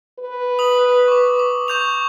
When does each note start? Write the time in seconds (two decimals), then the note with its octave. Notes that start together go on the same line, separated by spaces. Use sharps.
0.19 B4
0.59 D#6 F#7
1.08 C#6 D6
1.39 D6
1.68 C#6 G6 F7